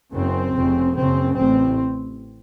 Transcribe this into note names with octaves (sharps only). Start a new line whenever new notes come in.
F#1 F#2 C#3 C4
F1 F2 C#3
F#1 F#2 C#3 C4
A1 A2 C4